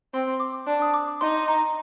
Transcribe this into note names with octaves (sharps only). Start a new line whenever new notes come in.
C4 C6
D6
D4
D#6
D6
D#4 C6
A#5